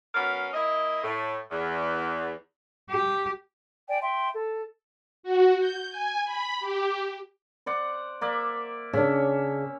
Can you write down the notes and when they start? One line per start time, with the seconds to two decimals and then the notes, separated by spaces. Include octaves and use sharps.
0.15 F#3 B3 C#4 A#4 F5
0.53 A#3 E4 D#5
1.03 A2
1.51 E2
2.90 G4
3.88 D5 G5 G#5
4.02 E5 G5 C6
4.33 A4
5.23 F#4
5.59 G6
5.90 G#5
6.25 B5
6.60 G4
7.66 C5 D5 F#5
8.21 A#3 D5 E5
8.93 C#3 C#4 D4 E5